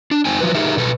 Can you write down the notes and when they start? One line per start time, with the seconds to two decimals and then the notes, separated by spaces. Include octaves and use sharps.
0.11 D4
0.25 F2 C4 D#4 G5 G#5
0.40 F3 F#3 B4
0.55 D#4 G4 G#4 A#4 E5
0.77 B2 A4 B4